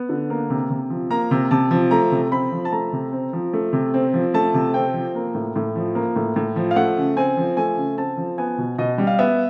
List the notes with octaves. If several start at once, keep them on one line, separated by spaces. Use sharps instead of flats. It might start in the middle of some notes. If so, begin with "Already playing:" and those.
Already playing: B3
D3
A#3
C3
C3
F3
A#3 A#5
C3
C3 A5
F3
A3 A#5
C3
C4 B5
F3
A5
A3 A#5
C3
C4
F3
A3
C3
C4
F3
A3 A5
C3
C4 G5
F3
A#3
A2
A2
F3
A#3
A2
A2
F3
F5
A3 F#5
C#3
C4 G#5
F3
A3 G#5
C#3
C4 A5
F3
B3 G#5
B2
B2 D#5
G3
F5
B3 E5